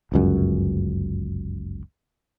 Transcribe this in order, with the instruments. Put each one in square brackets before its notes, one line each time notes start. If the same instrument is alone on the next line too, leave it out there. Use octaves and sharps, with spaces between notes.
[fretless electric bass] G1 C#2 F#2